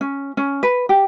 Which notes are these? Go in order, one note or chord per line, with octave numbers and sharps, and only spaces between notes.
C#4
C#4
B4
G4